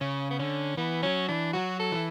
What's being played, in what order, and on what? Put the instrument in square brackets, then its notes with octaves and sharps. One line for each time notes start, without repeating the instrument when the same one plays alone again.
[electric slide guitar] C#3 [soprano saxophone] C#4
[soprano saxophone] B3
[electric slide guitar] D3 [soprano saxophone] C#4
[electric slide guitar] E3 [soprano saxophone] B3
[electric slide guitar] F#3 [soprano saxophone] C#4
[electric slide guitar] E3 [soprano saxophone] D4
[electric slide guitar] F#3 [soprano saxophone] F#4
[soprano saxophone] A4
[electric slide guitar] E3